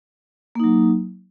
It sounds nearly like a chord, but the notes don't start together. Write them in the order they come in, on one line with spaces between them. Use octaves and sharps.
A#3 D#4 F#3